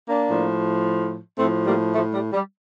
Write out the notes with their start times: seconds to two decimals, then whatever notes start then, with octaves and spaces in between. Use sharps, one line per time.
0.09 A#3 D4
0.28 A2 F3
1.39 A2 F3 A3 C4
1.66 G3 A#3
1.95 F3 A3
2.14 G3
2.32 G3